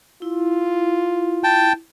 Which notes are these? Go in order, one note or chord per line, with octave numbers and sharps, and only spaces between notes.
E4 F4
G5 A5